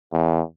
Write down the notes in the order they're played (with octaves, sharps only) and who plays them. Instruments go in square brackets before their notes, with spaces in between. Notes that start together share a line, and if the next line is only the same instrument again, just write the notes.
[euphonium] E2